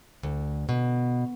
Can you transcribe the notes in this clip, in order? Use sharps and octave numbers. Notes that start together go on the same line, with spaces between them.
D2
B2